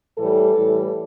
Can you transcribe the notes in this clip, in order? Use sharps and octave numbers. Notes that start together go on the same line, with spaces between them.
A2 E3 G3 A4
A2 E3 G3